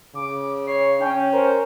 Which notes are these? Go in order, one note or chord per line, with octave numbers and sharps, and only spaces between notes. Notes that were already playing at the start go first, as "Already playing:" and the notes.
C#3 D6
C#5 C7
C#4 G5
A#4 C5